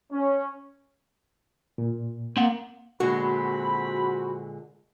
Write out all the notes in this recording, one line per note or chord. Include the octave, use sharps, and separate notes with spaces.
C#4
A#2
A#3 C4 F#5
A#2 D3 G#3 C4 F#4 B5